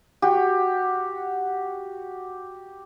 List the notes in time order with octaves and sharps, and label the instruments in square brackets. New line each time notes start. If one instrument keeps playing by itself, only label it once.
[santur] F#4 G4